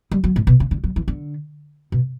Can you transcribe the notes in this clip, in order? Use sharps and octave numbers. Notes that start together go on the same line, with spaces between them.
G3
F#3
A2
B2
C#3
D3
F#3
E3
D3
B2